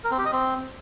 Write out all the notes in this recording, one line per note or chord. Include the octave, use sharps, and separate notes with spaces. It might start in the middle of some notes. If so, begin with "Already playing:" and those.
A#4
C4
G4
D#5
C4